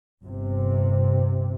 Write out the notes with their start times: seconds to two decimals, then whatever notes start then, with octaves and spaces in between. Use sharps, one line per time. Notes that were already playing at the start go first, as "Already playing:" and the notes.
0.22 G1 C3